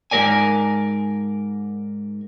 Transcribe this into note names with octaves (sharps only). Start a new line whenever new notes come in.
G#2 D#3 A#4 D5 G#5